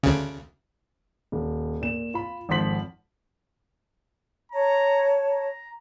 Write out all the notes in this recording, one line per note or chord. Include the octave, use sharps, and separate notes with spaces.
D2 C#3
D#1
A#2 E7
F4 B5
G#1 F2 F3 C6 B6 F#7
C#5 A5 A#5
A#5